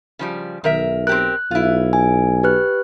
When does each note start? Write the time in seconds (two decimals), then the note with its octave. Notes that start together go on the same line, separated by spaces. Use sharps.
0.19 C#3 F3 G3
0.64 B1 D#3 A#4 E5
1.07 C4 G4 A#4 F#6
1.51 B1 E4 F4
1.93 G#5
2.43 G4 B4 F#6